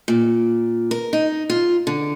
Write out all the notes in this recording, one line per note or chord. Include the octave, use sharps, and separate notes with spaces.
A#2
A#4
D#4
F4
D3